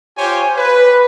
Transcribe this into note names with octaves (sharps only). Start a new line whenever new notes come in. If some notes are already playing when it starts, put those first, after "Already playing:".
F4 G4 C5 C#5 G#5
B4